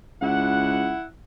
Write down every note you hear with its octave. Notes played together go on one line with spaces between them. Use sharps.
C#2 E4 F#5